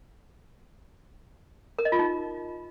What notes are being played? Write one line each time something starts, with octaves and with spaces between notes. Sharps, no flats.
A#4
D#5
F4
D#4